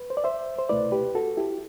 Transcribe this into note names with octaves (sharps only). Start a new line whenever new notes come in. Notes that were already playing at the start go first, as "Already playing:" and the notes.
Already playing: B4
C5
D5
C5 E5
C5
C2 B2 A3 E4 B4 D5
G4 B4
F#4 A4
E4 G4